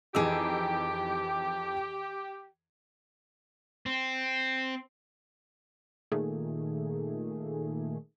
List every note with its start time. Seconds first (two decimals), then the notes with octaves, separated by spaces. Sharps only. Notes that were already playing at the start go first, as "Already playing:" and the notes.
0.15 F2 E3 D#4 G4 G#4 E6
3.86 C4
6.11 A#2 D#3 A3 A#3 G#4